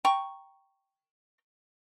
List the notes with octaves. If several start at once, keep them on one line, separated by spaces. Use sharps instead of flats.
G5 A#5 C#6